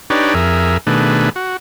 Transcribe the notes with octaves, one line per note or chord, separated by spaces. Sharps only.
D4 D#4 G4 B4 C#5 D5
F2 G#4 A#4 E5
B2 D#3 A3 D4 G#4 B4
F#4